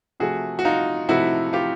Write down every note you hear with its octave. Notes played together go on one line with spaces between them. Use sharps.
C3 F3 A3 F#4 G#4
F#4
D#4 F4
C3 F3 A3 E4 F#4
F4 G4